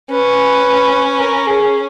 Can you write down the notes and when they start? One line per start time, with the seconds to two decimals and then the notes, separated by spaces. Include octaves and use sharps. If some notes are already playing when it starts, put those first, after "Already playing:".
0.11 C#4 B4
0.92 B4
1.20 A#4
1.47 G#4